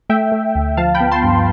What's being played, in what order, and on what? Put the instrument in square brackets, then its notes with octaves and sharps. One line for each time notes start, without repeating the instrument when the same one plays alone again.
[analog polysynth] A3 E5 G5
A3
D2
F3 F5 A5
G5 B5
B3
A5 C6
G2